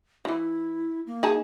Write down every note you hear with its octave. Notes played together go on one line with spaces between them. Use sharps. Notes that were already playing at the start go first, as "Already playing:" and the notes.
D#3 E3 E4
A#3
D#4 G#4 A5